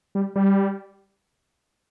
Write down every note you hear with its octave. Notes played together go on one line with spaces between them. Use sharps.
G3
G3